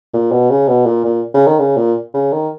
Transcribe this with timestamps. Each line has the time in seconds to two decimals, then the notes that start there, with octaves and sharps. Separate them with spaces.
0.13 A#2
0.31 B2
0.50 C#3
0.68 B2
0.86 A#2
1.04 A#2
1.34 C#3
1.47 D#3
1.59 C#3
1.77 A#2
2.14 C#3
2.32 D#3